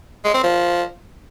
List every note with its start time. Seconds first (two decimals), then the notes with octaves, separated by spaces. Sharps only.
0.25 G#3
0.34 C4
0.43 F3